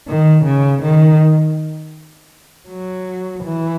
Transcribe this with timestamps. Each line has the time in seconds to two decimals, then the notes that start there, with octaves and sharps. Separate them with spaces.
0.08 D#3
0.45 C#3
0.83 D#3
2.69 F#3
3.44 E3